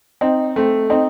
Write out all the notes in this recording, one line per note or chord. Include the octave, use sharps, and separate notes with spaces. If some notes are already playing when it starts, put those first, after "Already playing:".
C4 D#4
A3 C4
C4 D#4